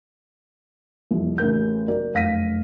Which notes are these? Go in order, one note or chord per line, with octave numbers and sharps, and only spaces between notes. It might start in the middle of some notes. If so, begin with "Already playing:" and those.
C2 F2
A1 C#3 A#4 G6
F#3 A#4 D5
F1 F#2 F5 A#6 B6 D#7